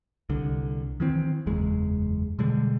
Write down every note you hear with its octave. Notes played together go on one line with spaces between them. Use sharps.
C2 D3
D#3 E3 C4
F#1 E2 G#3
B2 D3 G3 G#3